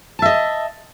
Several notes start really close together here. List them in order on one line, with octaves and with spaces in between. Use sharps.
A5 E5 D#5